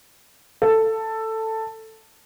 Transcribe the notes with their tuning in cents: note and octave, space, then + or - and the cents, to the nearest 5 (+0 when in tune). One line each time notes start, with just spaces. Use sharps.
A4 +10